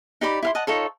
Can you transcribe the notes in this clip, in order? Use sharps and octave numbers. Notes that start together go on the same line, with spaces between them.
D#4 G4 D5 B5
E4 F5 C6
D#5 F#5 A5
D#4 F4 A4 C#5